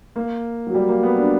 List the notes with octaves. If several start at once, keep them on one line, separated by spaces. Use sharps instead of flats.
A#3
F#3
G3
A#3
B3
D4